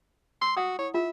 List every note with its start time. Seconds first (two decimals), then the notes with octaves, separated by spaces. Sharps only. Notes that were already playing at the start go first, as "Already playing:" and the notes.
0.42 C6 E6
0.57 F#4 F#5 D#6
0.79 E4 C#5
0.94 F4 E5